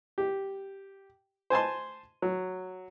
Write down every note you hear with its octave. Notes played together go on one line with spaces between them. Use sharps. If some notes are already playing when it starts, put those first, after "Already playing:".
G4
C5 G#5 A5 C6
F#3